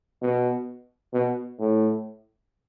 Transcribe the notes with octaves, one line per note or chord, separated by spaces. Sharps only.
B2
B2
A2